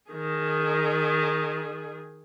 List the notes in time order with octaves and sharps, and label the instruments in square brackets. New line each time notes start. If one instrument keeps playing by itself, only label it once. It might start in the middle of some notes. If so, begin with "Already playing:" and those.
[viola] D#3 G#4